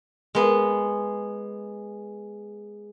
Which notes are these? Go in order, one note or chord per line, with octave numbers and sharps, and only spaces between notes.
G#3 B3